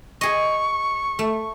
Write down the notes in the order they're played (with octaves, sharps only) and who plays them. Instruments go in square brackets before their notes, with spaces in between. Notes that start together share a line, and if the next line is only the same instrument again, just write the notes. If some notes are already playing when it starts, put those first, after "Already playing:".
[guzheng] G#4 D#5 [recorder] C#6
[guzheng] A3